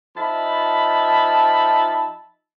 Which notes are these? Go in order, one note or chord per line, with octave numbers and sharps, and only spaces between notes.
F3 D#4 E5 A5 B5